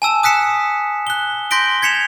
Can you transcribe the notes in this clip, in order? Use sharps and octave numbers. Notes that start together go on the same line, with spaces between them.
G#5 A5 E6 E7
D#6 F#6 B6 C#7 E7
F#6 G7
C6 G6 A#6 B6 D7 G7
G#6 B6 C#7 E7 F7